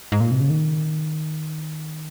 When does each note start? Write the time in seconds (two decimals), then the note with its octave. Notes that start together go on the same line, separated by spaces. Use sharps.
0.12 G#2
0.20 A#2
0.31 C3
0.41 C#3
0.50 D#3